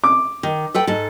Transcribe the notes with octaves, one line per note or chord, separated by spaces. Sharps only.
D6
D#3
A4 B4 G5
G#2 A4